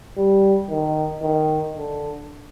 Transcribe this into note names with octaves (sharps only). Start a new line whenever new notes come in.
G3
D#3
D#3
D3